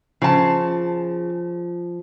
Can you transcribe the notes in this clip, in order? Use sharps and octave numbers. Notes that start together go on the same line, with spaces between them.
C#3 F3 A5